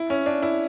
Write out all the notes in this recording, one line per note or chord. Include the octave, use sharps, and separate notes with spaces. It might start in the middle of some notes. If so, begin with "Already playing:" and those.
Already playing: E4
C#4
D4
E4